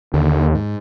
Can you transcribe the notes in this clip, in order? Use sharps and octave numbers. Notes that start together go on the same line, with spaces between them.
D#2 D3
G#2